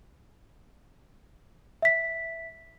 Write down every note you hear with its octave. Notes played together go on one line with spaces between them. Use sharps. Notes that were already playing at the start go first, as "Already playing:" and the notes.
E5 B6